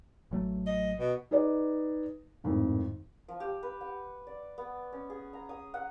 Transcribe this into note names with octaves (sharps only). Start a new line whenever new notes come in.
A1 F#3 A3
D#5
B2
D#4 G#4 B4 D5 D#5
G#1 F2 A2 D#3
F3
G4
B4
F#5
D5
B3
C#4
G#4
A#5
D#6
F#5